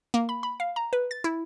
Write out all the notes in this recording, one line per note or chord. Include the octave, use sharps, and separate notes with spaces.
A#3
B5
B5
F5
A#5
B4
A6
E4